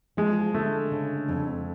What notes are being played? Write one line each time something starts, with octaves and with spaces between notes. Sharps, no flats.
F3 G#3
D3 A3
C#3
F2